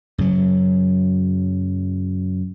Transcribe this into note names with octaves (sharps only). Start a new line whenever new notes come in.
F#2 C#3 F#3